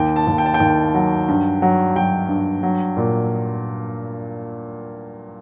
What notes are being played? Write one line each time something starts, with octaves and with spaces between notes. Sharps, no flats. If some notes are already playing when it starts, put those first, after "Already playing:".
Already playing: D#2 G5
A5
D#2
G5
A5
G5
D#2
F#3
G2
F#3
F#3 G5
G2
F#3
A#2